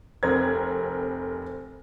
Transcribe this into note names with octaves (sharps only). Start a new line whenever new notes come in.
F1 C4 A#4 G#6